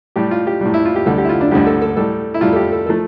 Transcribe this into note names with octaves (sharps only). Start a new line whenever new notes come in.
A2 G3 G4
F4
G4
A2 G3
E4
F4
G4
D2 D3 G3 A4
G4
E4
F4
D4
D2 D3 G3 G4
A4
A4
A2 G3 A4
E4
A2 G3 F4
A4
G4
A4
F3 A3 A4